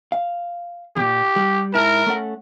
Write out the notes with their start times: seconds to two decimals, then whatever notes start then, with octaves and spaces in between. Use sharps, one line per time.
0.12 F5
0.96 E2 A#2 G4
1.36 G3
1.74 G#2 E4 A#4 A5
2.06 A3 C#4 F#5